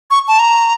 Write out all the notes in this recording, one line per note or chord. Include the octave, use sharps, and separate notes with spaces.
C#6
A5
A#5